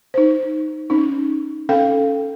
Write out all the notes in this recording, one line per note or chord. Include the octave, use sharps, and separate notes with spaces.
D#4 C5
C#4 D#4
C#4 A4 F5 G5